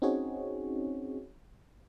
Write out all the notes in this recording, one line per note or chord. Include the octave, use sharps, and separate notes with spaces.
C4 C#4 D#4 F#4 G#4 C#5